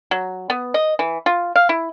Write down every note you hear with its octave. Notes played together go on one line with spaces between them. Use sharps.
F#3
B3
D#5
E3
F4
F5
E4